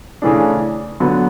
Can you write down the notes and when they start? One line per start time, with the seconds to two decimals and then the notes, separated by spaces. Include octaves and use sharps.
0.22 C#3 E3 A3 D4
1.00 D3 F#3 B3